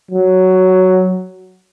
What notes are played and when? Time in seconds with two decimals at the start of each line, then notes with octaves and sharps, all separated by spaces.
0.11 F#3